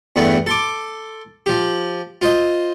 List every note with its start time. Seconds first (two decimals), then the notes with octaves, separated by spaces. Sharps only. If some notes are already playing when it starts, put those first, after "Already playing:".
0.16 E2 G2 A3 B3
0.46 A4 C6 D6
1.46 F3 G4
2.21 F4 C5 D#5